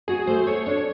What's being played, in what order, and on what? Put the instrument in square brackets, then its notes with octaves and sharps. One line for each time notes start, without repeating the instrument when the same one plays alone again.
[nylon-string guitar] F#4 [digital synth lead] G#4
[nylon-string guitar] A3 [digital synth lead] C5
[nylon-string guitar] A4 [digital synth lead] C#5
[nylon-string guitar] D4 [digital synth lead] C#5